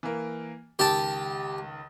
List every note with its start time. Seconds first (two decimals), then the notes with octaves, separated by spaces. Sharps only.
0.03 E3 A#3
0.79 C#2 D#3 G4 A5